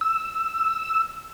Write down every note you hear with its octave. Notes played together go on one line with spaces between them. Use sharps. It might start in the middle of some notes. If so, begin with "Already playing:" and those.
E6